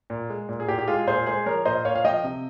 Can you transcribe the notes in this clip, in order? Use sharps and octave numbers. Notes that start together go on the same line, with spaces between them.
A#2
G#3
A#2
G#4
A#2 G4
G4
G#3 F4 G#4
A#2 G#4 C5
G#3 G#4 C5
F3 A#4 C#5
A#2 C5 D#5
A#2 C#5 F5
F5
F3 D#5 G5
C3